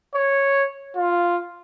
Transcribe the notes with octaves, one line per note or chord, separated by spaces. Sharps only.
C#5
F4